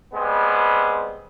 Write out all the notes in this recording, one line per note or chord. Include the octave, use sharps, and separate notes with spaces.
G3 G#3 B3 C4